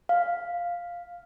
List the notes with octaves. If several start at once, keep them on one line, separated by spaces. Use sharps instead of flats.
F5